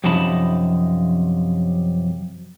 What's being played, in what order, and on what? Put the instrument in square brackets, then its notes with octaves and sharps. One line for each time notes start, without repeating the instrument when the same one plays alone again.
[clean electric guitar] F#2 C3 F3 D#4 A5 B5